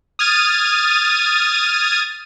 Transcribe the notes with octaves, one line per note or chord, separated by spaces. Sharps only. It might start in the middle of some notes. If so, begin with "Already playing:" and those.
D#6 F6 G#6 A6 D#7